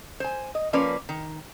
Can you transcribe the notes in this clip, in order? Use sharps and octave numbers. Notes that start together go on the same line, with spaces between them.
C5 G#5
D#5
F3 A#3 C#4 B4 D5
D#3